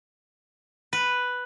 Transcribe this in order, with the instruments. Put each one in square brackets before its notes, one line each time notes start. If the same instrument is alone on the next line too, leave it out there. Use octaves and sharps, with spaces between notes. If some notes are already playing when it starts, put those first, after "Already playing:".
[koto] B4